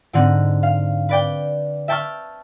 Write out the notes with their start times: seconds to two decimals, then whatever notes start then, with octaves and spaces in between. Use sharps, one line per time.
0.13 G#2 D3 C4 D#4 F#5
0.63 F5
1.09 B4 D5 G5
1.88 E5 G5 A5 C#6 F6